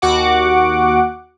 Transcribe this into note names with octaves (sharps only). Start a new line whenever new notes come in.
D#2 F#4 F#5 D6